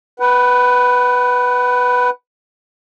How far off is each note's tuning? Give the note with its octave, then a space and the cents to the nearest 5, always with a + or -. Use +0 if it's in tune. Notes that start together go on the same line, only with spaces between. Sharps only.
B4 +0 F#5 +30